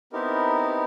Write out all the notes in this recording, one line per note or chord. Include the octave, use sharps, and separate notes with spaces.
B3 C4 D#4 E4 G4 A#4